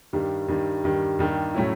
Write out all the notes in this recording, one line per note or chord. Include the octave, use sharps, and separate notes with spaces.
G2 D#3 G3
G2 D#3 G3
G2 D#3 G3
G2 D#3 G3
A2 F#3 A3 C#4 E4